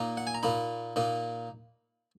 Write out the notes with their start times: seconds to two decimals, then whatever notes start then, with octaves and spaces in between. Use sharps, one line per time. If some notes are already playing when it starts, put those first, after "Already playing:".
Already playing: A#2 A#3 D#4
0.17 F#5
0.27 G#5
0.35 A#5
0.43 A#2 A#3 D#4 B5
0.96 A#2 A#3 D#4